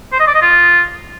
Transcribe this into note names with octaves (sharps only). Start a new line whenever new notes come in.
C5
D#5
D5
D#5
F4